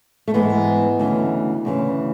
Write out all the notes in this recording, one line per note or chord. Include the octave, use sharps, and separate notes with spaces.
A3
G#2 E3 G#3 B3
D2 C#3 E3
D2 C#3 E3